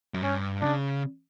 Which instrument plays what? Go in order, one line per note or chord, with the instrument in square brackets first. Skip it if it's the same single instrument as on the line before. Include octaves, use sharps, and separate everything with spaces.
[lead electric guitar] F#2
[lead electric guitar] G2 [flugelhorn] C#4
[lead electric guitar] C#3 [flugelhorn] D4